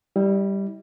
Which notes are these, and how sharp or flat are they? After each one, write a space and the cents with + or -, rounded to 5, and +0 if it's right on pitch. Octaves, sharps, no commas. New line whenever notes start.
G3 +0 E4 -45